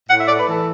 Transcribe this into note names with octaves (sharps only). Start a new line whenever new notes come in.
A2 F#5
E5
A3 D5
B4
E3 A4